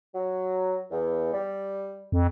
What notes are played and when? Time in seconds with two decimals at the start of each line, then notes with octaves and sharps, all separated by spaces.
0.14 F#3
0.91 E2
1.33 G3
2.12 F2